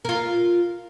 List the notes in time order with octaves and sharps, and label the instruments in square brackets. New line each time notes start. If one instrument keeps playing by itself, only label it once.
[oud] F4 A#4